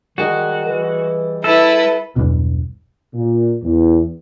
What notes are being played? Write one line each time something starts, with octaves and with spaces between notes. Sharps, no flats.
D#3 G3 F#4 G#4 D#5
E3
E4 A4 B4
B1 E2 G2 B2
A#2
E2